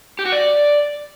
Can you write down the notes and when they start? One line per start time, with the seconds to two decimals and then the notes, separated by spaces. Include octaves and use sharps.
0.19 G4
0.25 F#4
0.32 D5